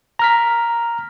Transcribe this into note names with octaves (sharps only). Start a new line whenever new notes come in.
A#5 F6 B6